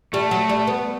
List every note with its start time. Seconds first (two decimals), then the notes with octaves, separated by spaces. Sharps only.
0.13 G3 A3
0.31 F#3
0.49 G3
0.67 B3